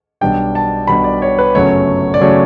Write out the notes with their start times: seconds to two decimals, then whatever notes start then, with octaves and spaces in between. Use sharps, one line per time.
0.21 B1 B2 G3 D4 G5
0.55 A5
0.87 B1 B2 G3 D4 B5
1.04 D5
1.22 C#5
1.39 B4
1.55 G1 F#2 C#3 F#3 A3 C#5
2.14 D5
2.21 C#3 F#3 A3 C#5